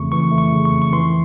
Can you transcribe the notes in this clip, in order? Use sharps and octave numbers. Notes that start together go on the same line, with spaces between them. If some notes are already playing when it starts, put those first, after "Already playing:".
Already playing: F2 C#3 E3 A3 C#6
E3 C#6
A3
C#6
C#3
C#6
F2
C#6
E3 C6